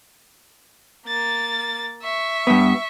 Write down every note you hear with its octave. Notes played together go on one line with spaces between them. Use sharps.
A#3 A6
E5 C#6
G2 B3